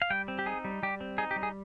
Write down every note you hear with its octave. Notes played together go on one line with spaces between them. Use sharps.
F5
G3 G5
C4
G4
D#4 G#4
G3
G3 G4
C4
D#4 G#4
G4
G3
G#4